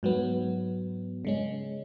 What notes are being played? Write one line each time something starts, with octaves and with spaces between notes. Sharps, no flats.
G#2 F#3 B3
C#3 G#3 C#4